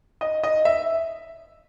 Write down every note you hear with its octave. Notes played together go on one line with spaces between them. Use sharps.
D#5
D#5
E5